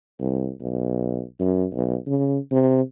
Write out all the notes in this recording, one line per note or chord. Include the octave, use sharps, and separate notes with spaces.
C2
B1
F#2
B1
C#3
C3